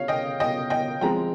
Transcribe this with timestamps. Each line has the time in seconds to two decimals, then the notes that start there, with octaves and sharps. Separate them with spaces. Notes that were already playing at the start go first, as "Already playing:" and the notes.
Already playing: C#3 C#5 F5
0.08 D#5 G5
0.40 D#5 G5
0.70 D#5 G5
1.01 F3 G#3 C4 G5 A#5